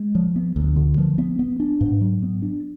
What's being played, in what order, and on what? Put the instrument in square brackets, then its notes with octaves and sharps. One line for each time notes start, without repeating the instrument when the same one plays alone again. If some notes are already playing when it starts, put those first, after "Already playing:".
Already playing: [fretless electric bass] G#3
F3
B3
D2
D3
F3
B3
B3
D4
G#2
F#3
B3
D4